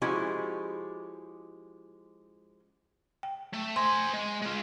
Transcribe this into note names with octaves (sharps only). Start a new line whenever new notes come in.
F3 G#3 C#4 E4 F#4 G4
G5
A3
C5 G#5 C6
G#3
G#3 F4